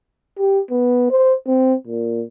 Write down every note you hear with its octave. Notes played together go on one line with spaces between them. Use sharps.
G4
B3
C5
C4
A#2